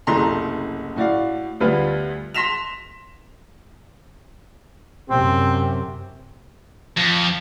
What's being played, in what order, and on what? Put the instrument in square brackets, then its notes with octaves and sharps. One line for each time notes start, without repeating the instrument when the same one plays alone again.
[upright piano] F#1 C2 A3 A#5 C6
A2 F#4 D5 F5
D2 G3 B3 F4 B4
C6 A#6 B6 E7 F7
[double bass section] F#2 C3 [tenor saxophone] C4
[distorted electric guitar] F2